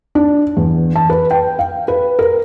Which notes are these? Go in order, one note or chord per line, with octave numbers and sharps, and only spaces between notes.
D4
E2
A5
B4
G5
F5
B4
A#4